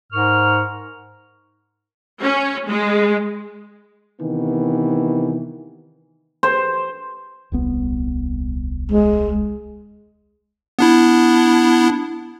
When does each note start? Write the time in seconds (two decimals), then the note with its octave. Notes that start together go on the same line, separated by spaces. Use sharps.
0.13 G#2 A#4 C#6 F6
2.21 C#4
2.68 G#3
4.19 C3 D#3 E3 B3
6.43 C5
7.52 D#1 C2 B3
8.92 G#3
10.79 B3 D4 E4